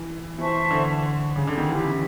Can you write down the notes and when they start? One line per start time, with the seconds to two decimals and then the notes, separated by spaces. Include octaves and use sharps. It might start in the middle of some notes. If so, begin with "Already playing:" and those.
Already playing: E3
0.38 E3 C5 E5 A5 C#6
0.71 D3
1.36 C#3
1.47 D3
1.57 D#3
1.69 E3 C#4 E4 G4